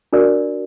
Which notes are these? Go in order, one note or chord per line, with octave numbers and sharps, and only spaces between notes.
D4 F#4 A#4 D5